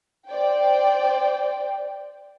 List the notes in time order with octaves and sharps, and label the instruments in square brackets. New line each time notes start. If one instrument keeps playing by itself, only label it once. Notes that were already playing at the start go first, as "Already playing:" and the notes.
[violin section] C5 D5 G5